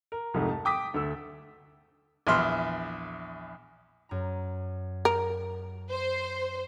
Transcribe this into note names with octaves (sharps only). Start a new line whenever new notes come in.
A#4
C2 F2 G#2 A3
A5
G5 D6 D#6 B6
D2 A3 E6
A#1 E2 E5 C6 F6
F#2 A#5
A#4
C5